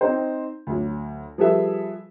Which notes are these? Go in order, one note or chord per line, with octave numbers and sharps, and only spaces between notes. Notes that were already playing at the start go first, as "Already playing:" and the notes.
C4 D#4 C5
D2 F#3
F3 G3 G#4 A4 B4 E5